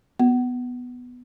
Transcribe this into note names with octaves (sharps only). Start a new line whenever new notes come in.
B3